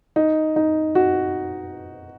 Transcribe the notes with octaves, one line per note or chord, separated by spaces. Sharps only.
D#4
D#4
F#4